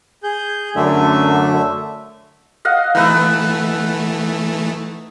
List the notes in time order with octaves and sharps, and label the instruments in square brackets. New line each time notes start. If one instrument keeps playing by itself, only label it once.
[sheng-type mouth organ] G#4 G6
[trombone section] F#2 D3 [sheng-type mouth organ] A3 E5
[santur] D#5 F5 F#5
[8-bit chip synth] E3 A3 [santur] D#4 B4 E5